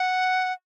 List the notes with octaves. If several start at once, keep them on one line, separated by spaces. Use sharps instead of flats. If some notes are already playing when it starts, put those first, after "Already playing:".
Already playing: F#5